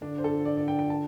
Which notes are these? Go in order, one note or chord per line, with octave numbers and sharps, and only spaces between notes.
D3 D4
C5
A4
D5
D5
G5
G5
A5